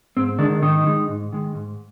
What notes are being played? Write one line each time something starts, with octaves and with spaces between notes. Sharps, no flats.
G#2 C4
D3 D#3 G#3 D4
G#2 D#3 D#4
D#3 G#3
G#2
D#3 G#3
G#2